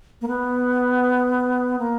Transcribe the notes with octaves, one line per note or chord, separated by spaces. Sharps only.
A#3
B3
A#3